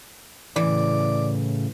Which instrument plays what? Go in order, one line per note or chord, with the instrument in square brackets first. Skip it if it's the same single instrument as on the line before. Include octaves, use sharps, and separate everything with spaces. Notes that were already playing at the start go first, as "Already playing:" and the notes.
[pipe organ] A2 C#3 [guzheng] E3 [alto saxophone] D5